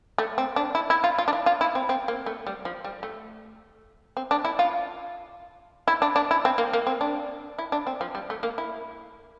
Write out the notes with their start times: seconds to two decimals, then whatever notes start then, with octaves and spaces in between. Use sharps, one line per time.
0.18 A3
0.38 C4
0.56 D4
0.75 E4
0.90 E4
1.04 F4
1.18 F4
1.28 D4
1.33 E4
1.46 F4
1.61 E4
1.75 C4
1.89 C4
2.08 A#3
2.26 A3
2.47 G3
2.65 F3
2.84 G3
3.03 A3
4.17 C4
4.31 D4
4.45 E4
4.59 F4
5.88 E4
6.02 D4
6.16 D4
6.31 E4
6.45 C4
6.58 A#3
6.73 A#3
6.87 C4
7.01 D4
7.58 E4
7.72 D4
7.87 C4
8.01 F3
8.15 G3
8.30 A3
8.43 A#3
8.58 E4